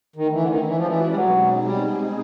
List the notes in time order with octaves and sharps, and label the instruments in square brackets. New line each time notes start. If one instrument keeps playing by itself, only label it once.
[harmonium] D#3 [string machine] A3 C#4 E4
[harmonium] E3
D3
D#3
[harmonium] E3 [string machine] G#3 C#4 F#4 B4 D5
[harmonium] F3
E3
G3
[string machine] B2 G#3 C4 D#4 G#4 [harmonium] F#3
[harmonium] G3